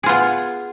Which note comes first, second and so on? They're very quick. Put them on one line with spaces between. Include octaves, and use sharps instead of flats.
G#4 F4 B3